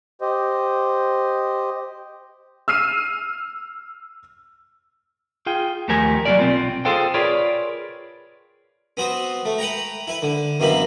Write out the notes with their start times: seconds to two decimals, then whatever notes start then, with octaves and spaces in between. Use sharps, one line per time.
0.21 G4 C5 D#5
2.68 E6 F6 C7 D#7
5.46 F4 G#4 G5
5.88 D#2 F3 A3 G4 A#4 G#5
6.25 F#3 G3 A#3 E4 A#4 D5
6.39 B1 C4 F4
6.85 F4 G#4 A4 C5 F5 G5
7.14 F4 G#4 A#4 B4 C#5 D5
8.97 B3 C4 F#4 D#6
9.45 A3
9.58 B4 F#5 G5 A#5
10.08 E4 B4
10.22 D3
10.60 F#2 B2 E3 A#3 C4 B5